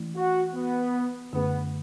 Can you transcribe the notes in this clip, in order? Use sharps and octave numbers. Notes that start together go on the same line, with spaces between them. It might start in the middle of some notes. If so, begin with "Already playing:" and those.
Already playing: E3 A3 C#4 E4
F#4
B3
F#2 D3 A3 B3 C#4 G#4